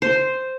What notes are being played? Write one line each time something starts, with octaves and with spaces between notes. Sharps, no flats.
C5